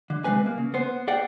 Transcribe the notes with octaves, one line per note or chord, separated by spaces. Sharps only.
D3
C3 G3 G#3 B4 G#5
A#3
C#3
B3 C5
G#4 D5 F#5 G5